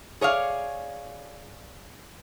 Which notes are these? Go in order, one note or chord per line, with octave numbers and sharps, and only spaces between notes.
G#4 C#5 D5 F5